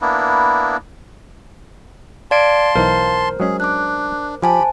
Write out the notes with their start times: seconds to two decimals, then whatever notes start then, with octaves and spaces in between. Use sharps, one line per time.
0.01 A#3 B3 D4 E4
2.31 D5 F5 A5 C6 G#6 D7
2.75 B1 E3 D#4 A#4 C5
3.40 F#3 G#3 C#4 G#4
3.60 D4 D6 F#6
4.42 F3 G4 C5 G#5 A5 B5